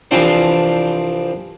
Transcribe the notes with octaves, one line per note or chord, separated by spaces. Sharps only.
C2 E3 F3 C4 D4 C5